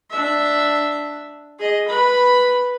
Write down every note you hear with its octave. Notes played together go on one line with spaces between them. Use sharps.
D4 E5
G#4 D#5
B4 B5